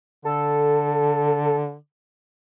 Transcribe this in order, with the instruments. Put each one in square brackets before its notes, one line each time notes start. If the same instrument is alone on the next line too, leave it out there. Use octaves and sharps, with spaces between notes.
[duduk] D3 [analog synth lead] A4